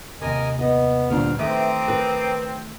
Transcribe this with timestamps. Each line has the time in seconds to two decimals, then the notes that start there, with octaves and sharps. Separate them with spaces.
0.21 D#2 C3 A#4 D#5 G#5
0.59 B3 D#5
1.10 D2 A#2 G3 B3 C4 D4 F6
1.39 D#3 A3 C4 B4 E5 A#5 D6 D#6
1.88 A#4 B4